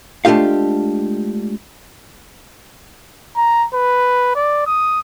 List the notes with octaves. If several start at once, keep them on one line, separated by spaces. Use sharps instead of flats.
G#3 A3 D4 F4 G4 F5
A#5
B4
D5
D#6